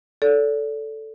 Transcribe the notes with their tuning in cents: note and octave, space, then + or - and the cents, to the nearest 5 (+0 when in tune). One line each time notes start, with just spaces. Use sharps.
A4 +0 D5 -35